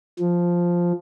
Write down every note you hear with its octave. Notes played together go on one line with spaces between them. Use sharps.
F3